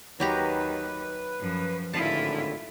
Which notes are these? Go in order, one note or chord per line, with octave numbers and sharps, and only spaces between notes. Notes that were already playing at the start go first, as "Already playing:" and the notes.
D#2 F#3 G4 B4 A#5
F#2 F3
G#1 A2 D3 E4 F4 A5